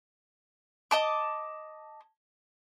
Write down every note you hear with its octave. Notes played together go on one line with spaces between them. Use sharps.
D#5 A5 D6